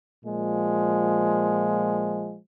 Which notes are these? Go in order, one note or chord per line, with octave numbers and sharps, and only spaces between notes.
A#2 F3 G#3